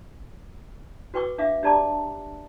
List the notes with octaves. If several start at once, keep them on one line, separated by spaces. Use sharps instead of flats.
F#4 B4 G5 C#6 D6 E6
D4 E5 F5 D6
D4 G4 D5 A5 A#5 D6